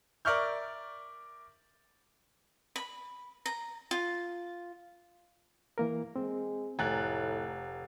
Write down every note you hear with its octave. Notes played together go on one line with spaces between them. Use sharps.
A#4 D5 E5 C#6 F6 G6
B5
A#5
F4
E3 A#3 A#4
G#3 C4
F1 A2 G#5 A#5 F#6 A6